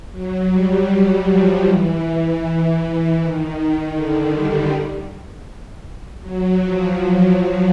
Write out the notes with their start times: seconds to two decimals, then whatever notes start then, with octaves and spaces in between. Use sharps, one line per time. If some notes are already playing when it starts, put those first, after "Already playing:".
0.11 F#3
0.49 G3
0.88 F#3
1.26 F3
1.64 E3
3.17 D#3
3.55 D#3
3.93 D3
4.32 G3
6.21 F#3
6.60 F3
6.98 F#3